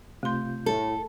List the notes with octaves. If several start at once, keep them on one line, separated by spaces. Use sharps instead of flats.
C3 A3 F4 C6 G6
A2 A4